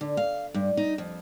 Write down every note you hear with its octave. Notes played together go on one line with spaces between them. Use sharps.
D3
F5
G2
D#4
F2